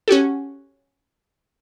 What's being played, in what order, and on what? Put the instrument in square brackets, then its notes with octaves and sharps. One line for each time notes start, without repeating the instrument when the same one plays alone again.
[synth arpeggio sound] C#4 F#4 G4 A4